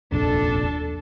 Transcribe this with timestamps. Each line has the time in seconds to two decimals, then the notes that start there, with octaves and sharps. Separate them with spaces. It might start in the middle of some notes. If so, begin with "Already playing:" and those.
0.12 F1 A#1 D#2 D4 A4